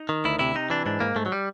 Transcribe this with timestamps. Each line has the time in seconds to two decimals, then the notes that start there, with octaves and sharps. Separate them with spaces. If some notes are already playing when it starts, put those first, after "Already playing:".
Already playing: D#4
0.09 D#3
0.25 D2 E4
0.39 C3 E4
0.55 C3 D#4
0.70 E3 D4
0.86 G#2 D4
1.00 G#2 A#3
1.16 G#2 A3
1.26 F#3
1.32 G3